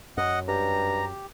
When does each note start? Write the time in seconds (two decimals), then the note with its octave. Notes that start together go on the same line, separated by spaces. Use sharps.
0.17 F#2 D#5 F#5
0.48 G2 G4 A#5